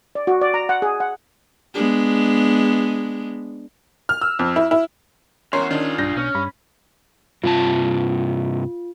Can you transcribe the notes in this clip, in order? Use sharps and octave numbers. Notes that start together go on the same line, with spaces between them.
D5
F#4
D5
A#5
F#5
G#4
F#5
G#3 B3 D4
F6
E6
F2
E4
E4
E2 C#4 F#4 A#4 C#5 C6 C7
D#3 C#4 D4 F4 G#4
B1 G2 D4 G6 A#6
B2 C#4
G2 B5
G2 C3 F4 A5